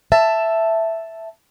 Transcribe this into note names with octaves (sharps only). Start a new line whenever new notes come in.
E5 A5